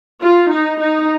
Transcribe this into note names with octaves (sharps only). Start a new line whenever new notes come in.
F4
D#4
D#4